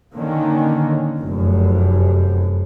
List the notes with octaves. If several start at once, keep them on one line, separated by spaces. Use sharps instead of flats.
D3 D#3 A#3 C#4
F1 F#2